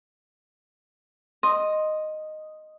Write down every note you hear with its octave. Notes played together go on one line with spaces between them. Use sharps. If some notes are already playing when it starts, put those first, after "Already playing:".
D#5 C6